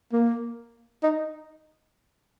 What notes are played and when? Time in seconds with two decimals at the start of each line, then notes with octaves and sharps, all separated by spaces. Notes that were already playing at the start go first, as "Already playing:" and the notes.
0.13 A#3
1.03 D#4